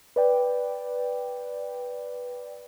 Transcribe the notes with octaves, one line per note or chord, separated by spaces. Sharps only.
B4 D5 G5